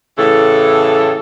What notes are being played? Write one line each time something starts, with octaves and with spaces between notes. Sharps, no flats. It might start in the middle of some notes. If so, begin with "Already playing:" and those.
A2 C#3 E3 A4